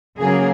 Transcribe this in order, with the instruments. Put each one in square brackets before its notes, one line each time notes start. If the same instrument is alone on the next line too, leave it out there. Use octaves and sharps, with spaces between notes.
[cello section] C#3 F#3 A#3 G#4